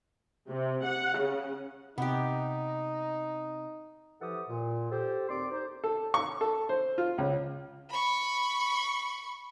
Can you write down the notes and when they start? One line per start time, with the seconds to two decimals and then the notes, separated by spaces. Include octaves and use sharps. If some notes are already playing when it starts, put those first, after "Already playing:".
0.48 C3
0.84 F#5
1.18 C#3
1.98 C3 B3 D#4 G4
4.21 E3 F3 G4 A4 F#5 D#6
4.48 A#2
4.91 G4 A4 C5
5.29 D#2 C4 D5 C6 D6
5.51 C4 D#4 G4 C5
5.84 A4
6.14 C#6
6.41 A4
6.69 C5
6.98 F4
7.18 C#2
7.90 B5 C#6